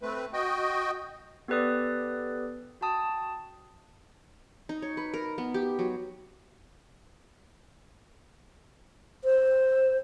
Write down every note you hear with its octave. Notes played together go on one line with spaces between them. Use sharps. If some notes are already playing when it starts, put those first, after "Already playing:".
A3 C4 B4
F#4 D#5 G5
B3 G4 A4 B4 D5 D#6
F#4 G5 A5 D#6
D#4
C#5
B4
A#4
B3
G4
F#3
C5